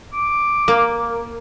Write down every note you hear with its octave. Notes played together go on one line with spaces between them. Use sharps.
D6
A#3